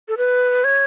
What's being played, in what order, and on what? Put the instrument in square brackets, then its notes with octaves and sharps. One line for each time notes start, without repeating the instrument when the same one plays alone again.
[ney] A4
B4
C#5